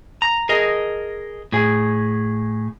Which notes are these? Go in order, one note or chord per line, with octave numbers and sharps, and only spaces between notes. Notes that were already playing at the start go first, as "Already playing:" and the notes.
A#5
G#4 A#4 D#5
A2 G#4